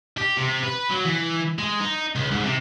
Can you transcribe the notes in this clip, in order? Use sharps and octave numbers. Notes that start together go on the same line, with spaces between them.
G4
C3
B4
F#3
E3
G#3
D#4
C#2
G#2
C3